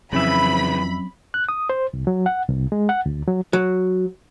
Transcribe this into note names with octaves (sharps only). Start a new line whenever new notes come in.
F2 C#3 E3 F#3 C4 C#4 E5 B5
F#6
D#6
C5
C2
F#3
F#5
C2
G#3
F#5
D2
F#3
F#3